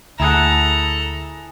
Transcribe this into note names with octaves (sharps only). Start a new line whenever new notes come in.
D2 E4 G#4 A4 F#5 A#5